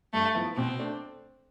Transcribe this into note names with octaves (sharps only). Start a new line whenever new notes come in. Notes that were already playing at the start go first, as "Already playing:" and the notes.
G2 A3
F3 B3 E4
B2 C4
A3 D4